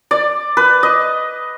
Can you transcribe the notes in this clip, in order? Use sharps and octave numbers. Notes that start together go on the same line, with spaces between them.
D5
B4
D#5